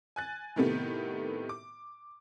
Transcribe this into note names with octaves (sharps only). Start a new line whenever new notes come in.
G#5 F#6 A6
A2 C3 D#3 A3 B3 G4
D6